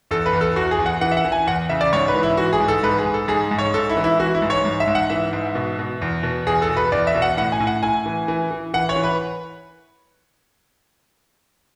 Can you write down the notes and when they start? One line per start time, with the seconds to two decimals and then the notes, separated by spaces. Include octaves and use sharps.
0.11 E2 A4
0.26 B4
0.33 E2
0.41 A4
0.56 E2 F#4
0.71 G#4
0.79 E2
0.86 F#5
1.01 E3 F#5
1.11 E5
1.17 F#5
1.25 E3
1.32 G#5
1.47 E2 F#5
1.69 C#3 E5
1.81 D5
1.93 G#2 C#5
2.08 B4
2.15 E3
2.23 E4
2.37 E3 F#4
2.53 G#4
2.60 G#2
2.68 A4
2.83 G#2 B4
2.98 G#4
3.06 G#2
3.14 A4
3.28 G#2 G#4
3.51 G#2
3.58 C#5
3.74 G#2 A4
3.89 E4
3.97 E3
4.04 E4
4.20 E3 F#4
4.35 E4
4.42 G#2
4.50 C#5
4.65 G#2
4.80 E5
4.88 G#2
4.95 F#5
5.10 E3 E5
5.33 G#2
5.55 B2
5.79 B2
6.01 E2
6.23 B2
6.47 E2 G#4
6.62 A4
6.69 B2
6.77 B4
6.92 E2 D5
7.07 E5
7.14 B2
7.22 F#5
7.37 A2 F#5
7.52 G#5
7.60 A2
7.67 F#5
7.83 A2 G#5
8.06 E3
8.28 E3
8.51 E3
8.74 E3 F#5
8.89 C#5
8.96 E3
9.04 B4